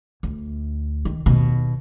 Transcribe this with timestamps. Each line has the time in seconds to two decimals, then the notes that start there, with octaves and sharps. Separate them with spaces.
0.23 D2
1.05 D#3
1.26 D#2 B2